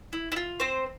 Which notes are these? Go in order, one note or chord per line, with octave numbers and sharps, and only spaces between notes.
E4
E4
F4
C4 C5